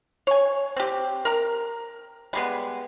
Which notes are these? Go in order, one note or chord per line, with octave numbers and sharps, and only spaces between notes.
C#5 G#5
C4 G4
A#4 A#5
G3 G#3 B3